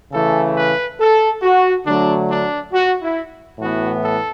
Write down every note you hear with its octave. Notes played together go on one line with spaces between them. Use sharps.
C#3 E3 A3 A4
B4
A4
F#4
D3 F#3 A3 D4
D4
F#4
E4
A2 E3 B3 F#4
A4